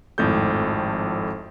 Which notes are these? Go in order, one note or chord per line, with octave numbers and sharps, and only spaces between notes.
G#1 F2 A2 A4 G6